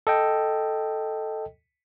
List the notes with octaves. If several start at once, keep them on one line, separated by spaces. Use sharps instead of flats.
A4 D#5 G5